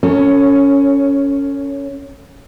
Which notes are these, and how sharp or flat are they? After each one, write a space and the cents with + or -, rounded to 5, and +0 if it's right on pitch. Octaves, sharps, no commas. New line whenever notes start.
C#4 +10 A4 +40 C#5 -10